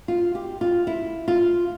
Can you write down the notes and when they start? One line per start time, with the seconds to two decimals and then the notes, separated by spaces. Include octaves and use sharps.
0.08 F4
0.35 G4
0.61 F4
0.87 E4
1.28 F4